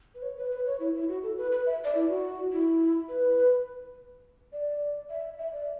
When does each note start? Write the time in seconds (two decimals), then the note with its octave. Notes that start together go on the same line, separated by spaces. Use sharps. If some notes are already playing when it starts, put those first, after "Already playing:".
0.15 B4
0.22 C#5
0.37 B4
0.51 B4
0.66 C#5
0.80 E4
0.95 E4
1.09 F#4
1.23 A4
1.37 B4
1.52 B4
1.66 E5
1.84 D5
1.95 E4
2.09 F#4
2.52 E4
3.09 B4
4.53 D5
5.10 E5
5.38 E5
5.53 D5